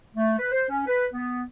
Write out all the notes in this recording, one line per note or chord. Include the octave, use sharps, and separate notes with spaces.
A3
B4
C5
C#4
B4
B3